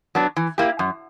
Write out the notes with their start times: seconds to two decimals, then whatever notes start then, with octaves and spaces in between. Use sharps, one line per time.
0.15 F#3 B3 D4
0.36 E3
0.58 A#3 E4 G4
0.79 F#2